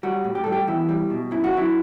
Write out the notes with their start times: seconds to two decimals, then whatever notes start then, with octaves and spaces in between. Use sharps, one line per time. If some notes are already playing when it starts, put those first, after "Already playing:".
0.03 G3 F#4
0.24 A2
0.35 G4
0.44 G3 A4
0.52 G4
0.67 E2 E4
0.89 G3
1.10 B2
1.31 F#2 E4
1.44 F#4
1.54 F#3 E4